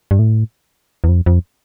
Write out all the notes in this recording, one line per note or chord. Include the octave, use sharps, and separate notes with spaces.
G2
A2
E2
F2
F2